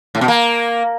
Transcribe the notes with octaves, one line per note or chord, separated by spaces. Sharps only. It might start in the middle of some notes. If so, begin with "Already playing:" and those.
A2
B2
A#3